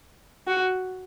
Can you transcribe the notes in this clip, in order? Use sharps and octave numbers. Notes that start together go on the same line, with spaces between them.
F#4